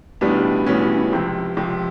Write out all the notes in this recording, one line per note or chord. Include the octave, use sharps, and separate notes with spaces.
B1 A2 E3 G3 B3 D4
B1 A2 E3 G3 B3 C#4
C#4
C#4
C#2 C3 F3 C4
C#2 C3 F3